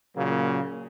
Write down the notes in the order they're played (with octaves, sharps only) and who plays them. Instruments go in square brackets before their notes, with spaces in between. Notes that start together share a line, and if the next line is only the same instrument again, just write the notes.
[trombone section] A#2 C#3 F#3 A#3